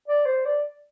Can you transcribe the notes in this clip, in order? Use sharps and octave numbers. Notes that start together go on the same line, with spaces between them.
D5
C5
D5